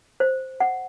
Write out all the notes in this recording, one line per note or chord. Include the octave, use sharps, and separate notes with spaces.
C5
F#5